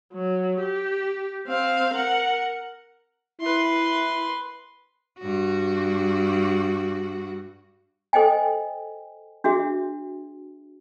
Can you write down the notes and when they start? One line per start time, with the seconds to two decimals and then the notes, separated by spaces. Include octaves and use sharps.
0.13 F#3
0.61 G4
1.48 C4 F5
1.94 A#4 F#5
3.41 E4 B4 C6
5.19 G2 F#4
8.13 A4 C5 D#5 G5 G#5
9.44 D4 F#4 G#4 E5